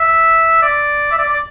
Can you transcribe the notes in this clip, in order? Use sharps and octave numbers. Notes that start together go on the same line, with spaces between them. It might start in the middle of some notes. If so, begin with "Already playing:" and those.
Already playing: E5
D5
E5
D5
D5